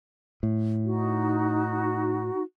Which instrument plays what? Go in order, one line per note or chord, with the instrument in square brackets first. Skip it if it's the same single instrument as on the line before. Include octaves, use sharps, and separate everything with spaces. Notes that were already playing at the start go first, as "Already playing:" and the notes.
[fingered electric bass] A2
[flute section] D#4 F#4